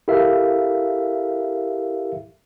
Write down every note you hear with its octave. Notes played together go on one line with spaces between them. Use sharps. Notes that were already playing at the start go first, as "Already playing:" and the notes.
E4 G4 A4 A#4 E5 F5